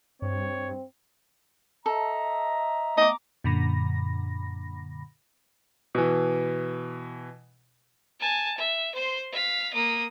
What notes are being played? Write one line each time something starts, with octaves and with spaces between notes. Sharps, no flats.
G2 C4 C#5
A4 D#5 E5 A#5
A3 B3 D#5 A#5 D6
F#2 A#2 D3 B5 A#6
B2 E3
G#5 A5
E5
C5 C6
F5 B6
A#3 D#6